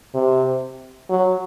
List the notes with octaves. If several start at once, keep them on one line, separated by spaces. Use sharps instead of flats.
C3
F#3